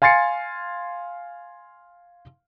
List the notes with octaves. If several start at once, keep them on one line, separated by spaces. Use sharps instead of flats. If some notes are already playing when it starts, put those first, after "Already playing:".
F5 G#5 C6 A6 C7 C#7